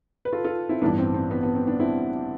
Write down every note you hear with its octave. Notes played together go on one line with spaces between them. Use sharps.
B4
F4 A4
F4 A4
C4 E4
A1 G2 E3 B3 D4
C4
C4
B3
B3
C4
B3 D4
C4 E4